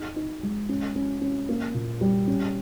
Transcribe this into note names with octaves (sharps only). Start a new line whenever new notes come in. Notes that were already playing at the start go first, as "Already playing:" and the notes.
Already playing: D#4
D#4
G#3
C#4
C#4
C#4
A#3
A#2
G3
C#4